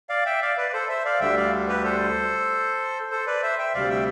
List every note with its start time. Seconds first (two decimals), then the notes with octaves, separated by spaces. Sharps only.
0.09 D5 F5
0.26 E5 G5
0.42 D5 F5
0.57 B4 D5
0.73 A4 C5
0.89 C5 E5
1.05 D5 F5
1.21 D2 D3 G3 E5 G5
1.37 D5 F5
1.68 G4 B4
1.84 A4 C5
3.10 A4 C5
3.27 B4 D5
3.43 C5 E5
3.59 E5 G5
3.74 D2 C3 G3 D5 F5
3.90 E5 G5